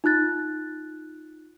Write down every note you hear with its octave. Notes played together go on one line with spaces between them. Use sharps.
D#4 F4 F#6 A6